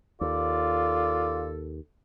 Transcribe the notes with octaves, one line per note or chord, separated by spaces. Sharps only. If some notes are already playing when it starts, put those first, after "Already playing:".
D#2 F4 A4 D5